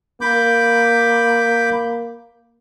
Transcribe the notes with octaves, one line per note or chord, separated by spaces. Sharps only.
A#3 B5 D6 G6